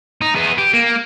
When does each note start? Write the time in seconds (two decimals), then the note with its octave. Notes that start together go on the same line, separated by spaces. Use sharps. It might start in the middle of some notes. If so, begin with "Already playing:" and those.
0.21 D#4
0.35 B3 G#4
0.58 G4
0.73 A#3